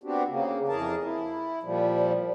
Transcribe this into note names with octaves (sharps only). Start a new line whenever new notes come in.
B3 C4 D4 F#4 G4
C#3 A#3
F2 E3 G#4 A#4 A5
E4
A#2 F3 G3